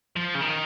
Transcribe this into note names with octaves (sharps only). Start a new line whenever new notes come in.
F3
C#3
D#3